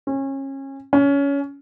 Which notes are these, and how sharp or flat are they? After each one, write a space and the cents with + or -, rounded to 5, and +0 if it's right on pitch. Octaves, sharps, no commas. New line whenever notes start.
C#4 -30
C#4 +20